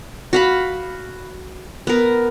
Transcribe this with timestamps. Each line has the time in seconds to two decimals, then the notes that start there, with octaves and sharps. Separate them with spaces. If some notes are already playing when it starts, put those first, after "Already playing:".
0.33 F#4 F5 B5
1.87 B3 A#4